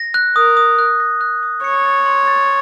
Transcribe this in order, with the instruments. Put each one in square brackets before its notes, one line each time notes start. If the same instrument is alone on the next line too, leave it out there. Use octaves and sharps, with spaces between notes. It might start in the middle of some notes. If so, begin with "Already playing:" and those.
Already playing: [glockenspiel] A#6
F#6
[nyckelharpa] A#4 [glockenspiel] D#6
[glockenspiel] D#6
F#6
A#6
F#6
D#6
[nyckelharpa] C#5 [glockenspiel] C#7
[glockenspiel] A6
C6
A6